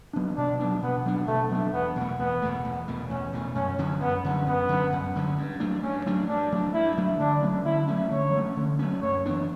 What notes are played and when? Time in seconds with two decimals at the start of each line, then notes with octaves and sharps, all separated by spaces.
0.13 F#3 B3 D4
0.37 B2 D4
0.59 F#3 B3 D4
0.82 B2 B3
1.05 F#3 B3 D4
1.27 B2 A3
1.51 F#3 B3 D4
1.73 E2 B3
1.96 B2 A3
2.19 E2 B3
2.42 B2 A3
2.64 E2
2.88 B2 A3
3.09 E2 C#4
3.33 B2 A3
3.55 F#2 C#4
3.79 D3 F#3 C#4
4.01 F#2 B3
4.24 D3 F#3 C#4
4.47 F#2 B3
4.69 D3 F#3 C#4
4.92 F#2
5.15 D3 F#3 C#4
5.38 G2
5.60 F#3 A3 D4
5.83 G2 C#4
6.06 F#3 A3 D4
6.28 G2 D4
6.52 F#3 A3 D4
6.74 G2 E4
6.97 F#3 A3 D4
7.19 D3 D4
7.42 F#3 A3 C#4
7.65 D3 E4
7.88 F#3 A3 C#4
8.11 D3 C#5
8.33 F#3 A3 C#4
8.56 D3
8.79 F#3 A3 C#4
9.02 F#2 C#5
9.26 E3 B3 D4